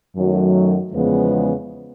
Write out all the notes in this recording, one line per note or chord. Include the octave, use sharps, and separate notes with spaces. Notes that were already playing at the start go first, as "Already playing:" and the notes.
F#2 D#3 F#3 A3
E2 C#3 F3 G#3 B3